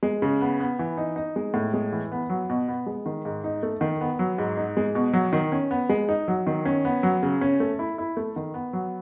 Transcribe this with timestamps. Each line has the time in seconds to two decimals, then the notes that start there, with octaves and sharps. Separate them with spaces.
0.03 G#3
0.22 C#3
0.41 B3
0.60 B3
0.79 E3
0.97 D#4
1.16 D#4
1.36 G#3
1.54 A2
1.74 G#3
1.92 E3
2.12 B3
2.30 F#3
2.50 B2
2.68 B3
2.87 G#3
3.06 D#3
3.25 G#2
3.44 D#4
3.63 A3
3.81 D#3
4.01 B3
4.19 F#3
4.38 G#2
4.57 D#4
4.77 G#3
4.95 B2
5.13 F#3
5.33 D#3
5.52 C#4
5.71 B3
5.89 G#3
6.09 D#4
6.28 F#3
6.47 D#3
6.65 C#4
6.85 B3
7.03 F#3
7.23 C#3
7.41 C#4
7.60 A3
7.79 E4
7.98 E4
8.17 A3
8.36 D#3
8.54 B3
8.73 F#3